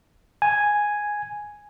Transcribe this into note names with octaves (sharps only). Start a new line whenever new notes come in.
G#5